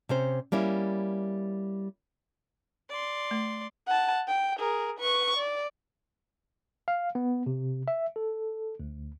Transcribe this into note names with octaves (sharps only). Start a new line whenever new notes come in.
C3 C#4 C5
G3 A#3 C#4 E4
D5 C6
A3
F#5 A5
G5
G#4 A#4
B4 C#6
D5
F5
B3
C3
E5
A4
D2